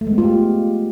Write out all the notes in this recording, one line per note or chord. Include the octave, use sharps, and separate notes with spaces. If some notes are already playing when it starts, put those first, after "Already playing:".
A3
G#3
B3
F4
G4